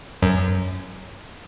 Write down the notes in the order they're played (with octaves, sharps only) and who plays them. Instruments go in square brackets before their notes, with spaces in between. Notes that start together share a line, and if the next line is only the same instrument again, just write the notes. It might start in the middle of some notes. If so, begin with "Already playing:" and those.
[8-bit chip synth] F#2